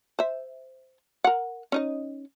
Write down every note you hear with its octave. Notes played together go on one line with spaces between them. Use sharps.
C5 E5
A#4 F#5
C#4 D#4 D#5